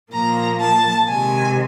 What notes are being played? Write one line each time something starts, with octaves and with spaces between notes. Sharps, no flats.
A#2 F3 A#3 A#5
A5
C3 D#3 G#3 G#5